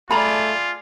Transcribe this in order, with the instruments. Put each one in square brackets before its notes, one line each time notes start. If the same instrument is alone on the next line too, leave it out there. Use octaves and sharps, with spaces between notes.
[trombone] A3 [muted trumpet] F4 [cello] G#4 D5 [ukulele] A#5 B5